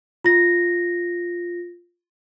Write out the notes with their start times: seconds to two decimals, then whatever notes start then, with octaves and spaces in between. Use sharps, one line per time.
0.25 F4 A#6